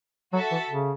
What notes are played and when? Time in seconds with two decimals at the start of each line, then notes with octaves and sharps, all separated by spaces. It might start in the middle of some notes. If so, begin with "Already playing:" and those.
0.33 F#3 F#4 A4 E5 A5
0.52 E3
0.70 C#3